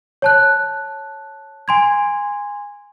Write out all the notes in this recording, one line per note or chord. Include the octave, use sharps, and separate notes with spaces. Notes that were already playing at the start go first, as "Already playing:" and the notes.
C#5 A5 F#6
G#5 C6 G#6